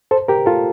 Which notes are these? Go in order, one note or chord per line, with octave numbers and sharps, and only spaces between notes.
A4 C5
G4 A#4
F4 A4